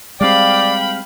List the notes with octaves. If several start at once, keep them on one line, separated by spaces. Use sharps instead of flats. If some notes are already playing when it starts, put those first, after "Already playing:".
G3 G#3 C4 D5 F5 G5 B5